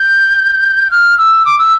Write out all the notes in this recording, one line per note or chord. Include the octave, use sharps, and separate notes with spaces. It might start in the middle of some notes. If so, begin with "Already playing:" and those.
Already playing: G6
F6
E6
D6
E6